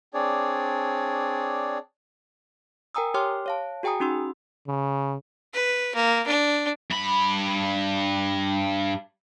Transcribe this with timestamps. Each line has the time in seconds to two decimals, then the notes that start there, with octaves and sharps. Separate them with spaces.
0.14 C4 D4 G#4 C#5 D5
2.95 A#4 G5 G#5 A#5 D#6 E6
3.14 G4 C#5 G5 C6 D6 F6
3.46 C#5 F5 A5
3.83 F#4 G#4 G5 G#5 A#5 D#6
4.00 C#4 D#4 F#4 C6 E6
4.67 C#3
5.54 B4
5.95 A#3
6.27 D4
6.91 G2 B5